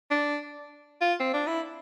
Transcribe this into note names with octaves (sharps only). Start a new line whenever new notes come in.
D4
F4
C4
D4
E4